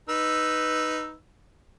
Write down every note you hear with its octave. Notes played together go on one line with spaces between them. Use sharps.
D#4 B4 E6